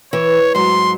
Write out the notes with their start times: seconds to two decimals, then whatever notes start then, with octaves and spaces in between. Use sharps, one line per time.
0.13 E3 C#5
0.55 G#2 F#3 C6